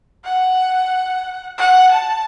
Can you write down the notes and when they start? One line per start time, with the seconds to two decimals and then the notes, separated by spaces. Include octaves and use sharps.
0.25 F#5
1.58 F#5
1.91 A5